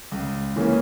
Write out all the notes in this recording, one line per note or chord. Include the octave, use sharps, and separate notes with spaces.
C#2
C#3 E3 A#3 C#4